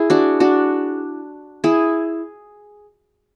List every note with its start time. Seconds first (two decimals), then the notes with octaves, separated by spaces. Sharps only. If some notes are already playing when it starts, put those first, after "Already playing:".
Already playing: E4 G#4
0.10 D4 F#4
0.40 D4 F#4
1.64 E4 G#4